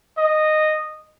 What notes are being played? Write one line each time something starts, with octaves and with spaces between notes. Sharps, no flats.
D#5